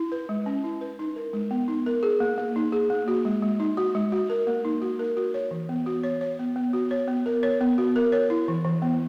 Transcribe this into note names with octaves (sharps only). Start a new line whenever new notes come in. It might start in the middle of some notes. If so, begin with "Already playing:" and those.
Already playing: E4
B4
G#3
C#4
E4
B4
D#4
A#4
G#3
B3
D#4
A#4
G#4
A#3
A#3
D#4
G#4
A#3
F#4
G#3
G#3
D#4
F#4
G#3
F#4
A#4
A#3
D#4
F#4
A#4
F#4
C#5
E3
B3
F#4
C#5
C#5
B3
B3
F#4
C#5
B3
A#4
C#5
B3
F#4
A#4
C#5
E4
E3
E3
B3